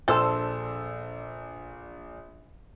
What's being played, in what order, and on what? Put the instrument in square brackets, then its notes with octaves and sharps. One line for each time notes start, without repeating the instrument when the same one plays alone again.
[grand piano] A#1 D4 E6 [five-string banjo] A4 C5